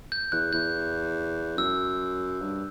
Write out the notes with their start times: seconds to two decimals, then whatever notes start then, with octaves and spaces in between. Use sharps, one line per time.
0.12 G6
0.32 E2 F#6
0.53 E2 G6
1.57 F#2 E6
2.42 G2